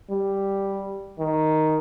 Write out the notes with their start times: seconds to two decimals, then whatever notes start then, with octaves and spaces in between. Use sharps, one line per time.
0.11 G3
1.19 D#3